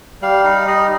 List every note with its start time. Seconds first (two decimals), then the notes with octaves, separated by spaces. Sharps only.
0.22 G3 F5
0.44 D#4 F5
0.67 G3 D#5